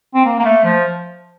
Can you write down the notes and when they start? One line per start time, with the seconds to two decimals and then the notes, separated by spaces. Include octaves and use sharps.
0.14 C4
0.25 A#3
0.40 A#3
0.45 A3
0.64 F3